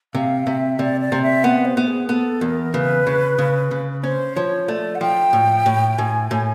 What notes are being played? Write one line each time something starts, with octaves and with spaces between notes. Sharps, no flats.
C3 F5
C3 E5
C3 D5
D5
C3
E5
B3 F#5
C5
B3
G#4
B3 A4
E2 A#4
C#3 B4
C#3
C#3
C#3
C#4 C5
F3 C#5
A3 D5
F#5
F3 G5
A2
A2
A2 G#5
A2